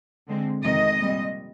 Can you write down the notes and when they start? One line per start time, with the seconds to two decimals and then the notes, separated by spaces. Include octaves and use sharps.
0.27 D3 G#3 C4
0.63 F2 C3 D#3 G#3 D#5
0.99 A#2 G3 C4